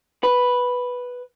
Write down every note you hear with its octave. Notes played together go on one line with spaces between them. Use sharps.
B4